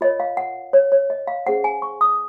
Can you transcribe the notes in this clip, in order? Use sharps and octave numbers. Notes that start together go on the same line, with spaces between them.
F4 A#4 C#5 D#5
F5
F#5
C#5
C#5
D#5
F5
C#4 G#4 C5 F#5
G#5
C#6
D#6